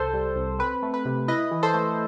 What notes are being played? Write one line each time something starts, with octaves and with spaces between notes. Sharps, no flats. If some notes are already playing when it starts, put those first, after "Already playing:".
Already playing: C2 A4 C5
G3
C2
C4 B4
A3
B4
C3
E4 B4 D#5
E3
A4 C5
A3